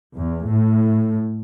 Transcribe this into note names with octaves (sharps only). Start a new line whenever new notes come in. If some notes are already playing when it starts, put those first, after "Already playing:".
E2
A2